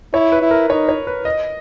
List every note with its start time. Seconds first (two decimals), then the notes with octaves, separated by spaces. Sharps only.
0.14 E4 C#5
0.32 B4
0.42 E4
0.51 A#4
0.70 D#4 C#5
0.89 C#5
1.07 B4
1.25 D#5